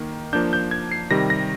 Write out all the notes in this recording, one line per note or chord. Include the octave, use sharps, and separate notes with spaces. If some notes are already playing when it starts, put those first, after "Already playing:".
Already playing: D#3 A#3
F3 A#3 D4 G6
G6
G#6
C7
C3 D#3 G3 A#6
A#6